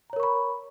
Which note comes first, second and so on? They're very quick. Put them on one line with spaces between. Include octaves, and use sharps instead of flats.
A#5 C#5 A#4 C#6 B5